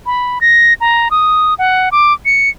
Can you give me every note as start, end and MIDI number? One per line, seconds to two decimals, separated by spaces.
0.06 0.39 83
0.41 0.74 94
0.81 1.09 82
1.11 1.54 87
1.59 1.89 78
1.92 2.13 86
2.26 2.49 97